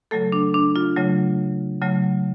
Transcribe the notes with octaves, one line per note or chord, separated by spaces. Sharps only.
C#3 F#3 A3 A4
D4
D4
F4
C#3 F#3 A3
C#3 F#3 A3